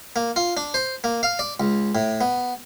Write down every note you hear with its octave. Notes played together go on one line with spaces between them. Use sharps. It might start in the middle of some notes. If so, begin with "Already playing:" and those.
A#3
F4
D4
C5
A#3
F5
D5
C#2
A2
B3